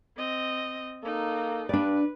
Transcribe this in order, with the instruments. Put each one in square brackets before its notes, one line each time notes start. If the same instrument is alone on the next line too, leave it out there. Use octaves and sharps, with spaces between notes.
[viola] C4 D#5
[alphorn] A#3 [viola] D#4 A4
[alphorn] G2 [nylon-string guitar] D4 D5 [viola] B4